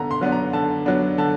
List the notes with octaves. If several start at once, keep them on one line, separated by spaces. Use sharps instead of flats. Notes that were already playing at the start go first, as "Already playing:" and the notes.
Already playing: D3 B3 A#5
C6
F#3 B3 D4
A#5
D3 A5
F#3 B3 D4
D3 A5